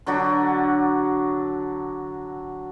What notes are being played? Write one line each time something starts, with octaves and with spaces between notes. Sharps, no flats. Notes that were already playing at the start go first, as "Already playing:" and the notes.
D3 F#3 D4 F#4